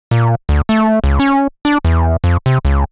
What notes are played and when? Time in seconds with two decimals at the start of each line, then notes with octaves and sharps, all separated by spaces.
0.11 A#2
0.49 D2
0.69 A3
1.04 C#2
1.19 C#4
1.65 D4
1.85 E2
2.24 F2
2.46 C3
2.65 C#2